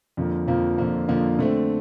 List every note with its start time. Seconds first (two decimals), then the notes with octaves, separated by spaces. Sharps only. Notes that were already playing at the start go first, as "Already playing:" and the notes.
0.17 F2 D3 F3 A#3
0.48 F2 D3 F3 A#3
0.78 F2 D3 F3 A#3
1.08 F2 D3 F3 A#3
1.39 D3 A3 C4